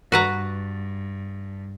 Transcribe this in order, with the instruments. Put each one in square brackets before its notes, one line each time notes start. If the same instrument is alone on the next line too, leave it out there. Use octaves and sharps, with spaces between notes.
[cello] G2 [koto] F#4 B4 A#5